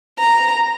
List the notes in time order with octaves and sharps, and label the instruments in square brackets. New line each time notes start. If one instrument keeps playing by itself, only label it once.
[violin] A#5